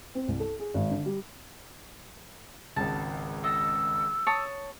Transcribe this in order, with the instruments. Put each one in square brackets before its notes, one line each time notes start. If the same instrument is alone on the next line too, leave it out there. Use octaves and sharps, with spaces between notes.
[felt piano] C4
C2
A4
G#4
G#1
D3
G3
[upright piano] G#1 C#2 [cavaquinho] A5
[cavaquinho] D#5 [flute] E6
[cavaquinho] C#5 A5 D#6